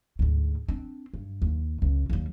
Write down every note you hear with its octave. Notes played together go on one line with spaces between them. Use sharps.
D2 G#2
C4 D4
G2
D#2
C#2
D#2 G3